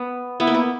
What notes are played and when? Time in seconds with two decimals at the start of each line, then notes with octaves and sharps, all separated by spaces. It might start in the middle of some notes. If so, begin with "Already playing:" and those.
Already playing: B3
0.40 B3 E4
0.47 A#3
0.54 B3